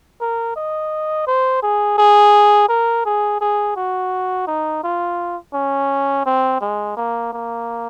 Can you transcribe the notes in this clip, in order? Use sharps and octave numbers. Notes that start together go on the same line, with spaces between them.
A#4
D#5
C5
G#4
G#4
A#4
G#4
G#4
F#4
D#4
F4
C#4
C4
G#3
A#3
A#3